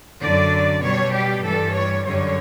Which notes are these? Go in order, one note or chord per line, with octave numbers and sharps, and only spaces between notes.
F#2 D3 F#3 D5
B2 G3 C#5
G4
G2 E3 G3 A4
C#5
F#2 D3 G3 C#5